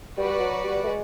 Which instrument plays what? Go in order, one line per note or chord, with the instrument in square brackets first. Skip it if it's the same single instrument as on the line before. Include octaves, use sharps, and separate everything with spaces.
[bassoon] G3 [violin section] F#4 B4 D5
[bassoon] F#3
G3
A3
G#3